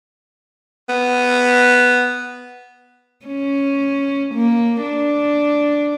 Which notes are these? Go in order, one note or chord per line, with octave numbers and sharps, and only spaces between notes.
B3
C#4
A#3
D4